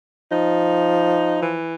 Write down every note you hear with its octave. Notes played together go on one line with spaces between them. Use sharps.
F3 D#4
E3